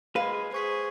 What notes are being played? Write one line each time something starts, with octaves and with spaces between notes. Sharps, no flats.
G#3 B4 F5 B5
G#4 C5 C#6 B6